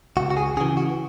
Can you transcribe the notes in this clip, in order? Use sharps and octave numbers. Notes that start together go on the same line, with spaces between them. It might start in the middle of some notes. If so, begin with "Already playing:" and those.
C#2 F#4
F#4
G#4
C#3 E3 G#4
F#4